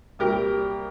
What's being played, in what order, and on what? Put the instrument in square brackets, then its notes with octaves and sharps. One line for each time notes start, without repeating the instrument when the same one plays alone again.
[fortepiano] C2 A#2 G3 G4 A#4